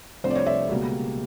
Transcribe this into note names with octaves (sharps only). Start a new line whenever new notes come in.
C2 C3 F3 A3 D4 C5
D5
C#5
D5 E5
C#2 B2 G3 A#3